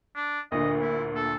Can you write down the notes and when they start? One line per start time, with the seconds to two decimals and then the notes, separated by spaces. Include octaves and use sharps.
0.15 D4
0.52 D2 A#2 D3 A#4 D#5
0.81 E4
1.16 A4